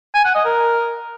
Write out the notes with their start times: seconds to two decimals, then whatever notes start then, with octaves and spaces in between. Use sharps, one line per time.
0.15 G#5
0.25 F#5
0.35 D#5
0.45 A#4